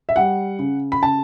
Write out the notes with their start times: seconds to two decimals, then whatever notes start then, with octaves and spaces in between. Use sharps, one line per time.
0.09 E5
0.16 G3 F#5
0.59 C#3
0.92 B5
1.02 C#3 A5